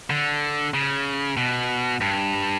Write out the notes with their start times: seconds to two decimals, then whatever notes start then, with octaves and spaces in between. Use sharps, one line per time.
0.10 D3
0.74 C#3
1.37 B2
2.01 G2